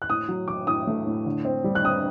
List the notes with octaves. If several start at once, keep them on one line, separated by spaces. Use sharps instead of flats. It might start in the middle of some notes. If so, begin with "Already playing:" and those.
F#6
A2 D#6
F#3
F#3 D6
A2 D#6
A3
A2
D3
C4
G3
F#6
C4 D#6